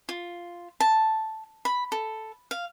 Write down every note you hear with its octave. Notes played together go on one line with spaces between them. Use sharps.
F4
A5
B5
A4
F5